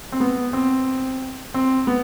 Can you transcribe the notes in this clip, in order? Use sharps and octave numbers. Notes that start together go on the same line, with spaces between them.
C4
B3
C4
C4
B3